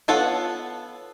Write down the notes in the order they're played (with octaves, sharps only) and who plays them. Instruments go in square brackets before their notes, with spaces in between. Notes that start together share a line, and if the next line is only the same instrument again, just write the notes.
[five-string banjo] B3 F4 A4 C#5 F#5